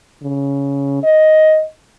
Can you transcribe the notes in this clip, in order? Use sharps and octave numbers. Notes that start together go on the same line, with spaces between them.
C#3
D#5